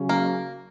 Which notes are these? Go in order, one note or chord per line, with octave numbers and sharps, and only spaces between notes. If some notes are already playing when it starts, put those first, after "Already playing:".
Already playing: C#3 F#3 C#4
A#3